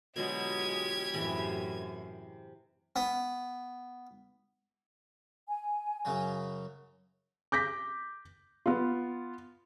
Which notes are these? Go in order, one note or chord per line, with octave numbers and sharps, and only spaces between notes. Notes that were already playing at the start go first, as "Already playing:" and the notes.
B2 D3 F#3 G#3 F4 G4 G#4 G#6
F#2 A2 C3 E3 G#3
B3
G#5
F#2 C#3 F#3
D6 G6 A#6 B6
B3 F4